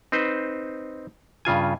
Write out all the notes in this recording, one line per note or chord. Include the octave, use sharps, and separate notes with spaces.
C4 D#4 B4 C5
G2 C#3 F4 G#5